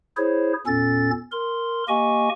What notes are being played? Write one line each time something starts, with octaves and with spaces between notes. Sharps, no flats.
E4 G#4 C5 C#5
E2 A#2 C#4 A4 A6
A#4 C6
A#3 G4 D#5 G#5 C#6